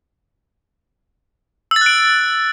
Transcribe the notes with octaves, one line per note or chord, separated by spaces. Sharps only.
E6
A6
F#6
D7